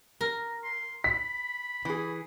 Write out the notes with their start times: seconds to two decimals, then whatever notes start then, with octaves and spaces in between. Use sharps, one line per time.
0.21 A#4
0.64 C6
1.04 B5 B6
1.85 E3 G#4